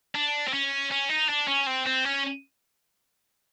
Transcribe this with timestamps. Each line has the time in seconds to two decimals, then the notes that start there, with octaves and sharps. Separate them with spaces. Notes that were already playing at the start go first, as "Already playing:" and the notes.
0.15 D4
0.48 C4
0.53 C#4
0.91 C#4
1.10 D#4
1.29 D4
1.48 C#4
1.67 C4
1.87 C4
2.05 C#4